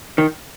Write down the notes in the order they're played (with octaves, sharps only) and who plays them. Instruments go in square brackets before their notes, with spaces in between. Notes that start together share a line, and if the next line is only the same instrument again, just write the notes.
[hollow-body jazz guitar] D#3